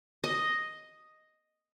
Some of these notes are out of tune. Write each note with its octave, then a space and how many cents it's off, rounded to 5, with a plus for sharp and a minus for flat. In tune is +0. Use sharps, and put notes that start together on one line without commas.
D#5 +0